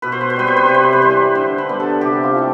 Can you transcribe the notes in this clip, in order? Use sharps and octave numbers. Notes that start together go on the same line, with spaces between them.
B2 B4
C5
B4
C5
G3 C4 B4
C5
B4
C3 C5
B4
C5
B4
E3 G3 C5
B4
D3 C5
B4
G3 B3
A4
C3 G4
F4
E3 A3 C4